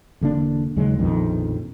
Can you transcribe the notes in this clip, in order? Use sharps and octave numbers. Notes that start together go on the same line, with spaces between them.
E1 D3 A#3 D4
D#2 C#3 F#3 G#3
A#1 F2 B2 D#3